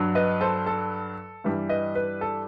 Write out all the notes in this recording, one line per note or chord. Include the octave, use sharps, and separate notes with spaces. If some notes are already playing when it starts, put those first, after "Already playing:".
Already playing: G2 F#3
B4 D#5
A4 C5
A4
G2 E3 G3
B4 D#5
B4
A4